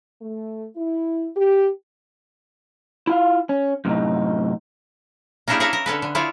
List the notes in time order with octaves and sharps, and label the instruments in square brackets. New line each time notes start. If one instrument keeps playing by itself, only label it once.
[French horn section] A3
E4
G4
[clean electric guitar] E4 F4 F5
C#4
F#2 A2 C3 D#4
[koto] A#3 C#4 D4 E4 G4 G#4
G#4 A#4 B4 C#5 E5 F5
A#4
D3 C#4 A4 B4
D3
E4 F4 C#5 D5